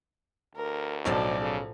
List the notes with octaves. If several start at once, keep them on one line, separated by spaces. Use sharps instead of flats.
D2 A#4
B1 A2 F3 C#4 A4 D5
C#3